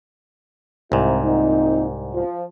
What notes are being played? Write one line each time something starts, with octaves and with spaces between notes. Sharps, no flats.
C2 G#2 C3 E4
A#2 C4 D#4
F3